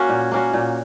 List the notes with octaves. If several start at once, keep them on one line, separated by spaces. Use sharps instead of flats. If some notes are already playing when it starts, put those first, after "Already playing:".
Already playing: A#3 C#4 F#4
A#2
A#3 C#4 F#4
A#2